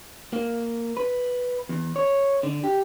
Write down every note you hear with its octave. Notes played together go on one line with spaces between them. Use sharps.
A#3
B4
E2
C#5
D3
G4